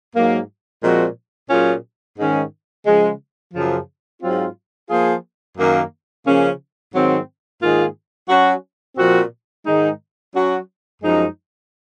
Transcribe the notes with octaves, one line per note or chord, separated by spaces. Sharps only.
G#2 F#3 A#3
A#2 F3 G#3 C4 F#4
A#2 F#3 C#4 F4 G#4
G#2 D#3 G#3 C#4
C#3 F3 G#3
F#2 C#3 F3
G#2 F#3 C4 F4
F3 A#3 F4 G#4
F#2 D#3 A#3
C#3 F3 A#3 C#4
G#2 D#3 F#3 C4
G#2 D#3 A#3 F4 G#4
F#3 C#4 F#4
A#2 F3 C4 F#4
G#2 D#3 G#3 D#4
F#3 C#4 F#4
F#2 F3 G#3 D#4